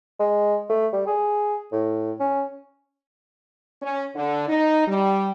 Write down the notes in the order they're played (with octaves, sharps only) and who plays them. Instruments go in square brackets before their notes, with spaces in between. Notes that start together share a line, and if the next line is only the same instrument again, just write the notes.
[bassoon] G#3
A3
G3
G#4
A2
C#4
[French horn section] C#4
D3
D#4
G3